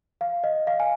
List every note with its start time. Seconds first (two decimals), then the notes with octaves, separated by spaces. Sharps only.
0.21 F5
0.44 D#5
0.67 F5
0.80 G#5